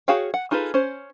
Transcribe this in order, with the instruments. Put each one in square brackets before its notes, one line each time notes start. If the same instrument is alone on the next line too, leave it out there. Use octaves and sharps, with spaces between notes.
[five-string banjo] F#4 G#4 C#5 F5 G5
F#5
D#4 F4 G#4 A4 B4
C#4 C5